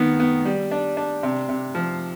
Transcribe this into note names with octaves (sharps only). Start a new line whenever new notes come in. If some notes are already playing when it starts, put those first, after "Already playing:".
Already playing: D#3 B3
B3
G3
D4
D4
C3
C3
F3